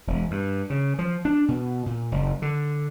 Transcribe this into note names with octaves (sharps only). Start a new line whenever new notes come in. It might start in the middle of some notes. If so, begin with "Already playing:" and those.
E1
G2
C#3
F3
D4
B2
A#2
F#1
D3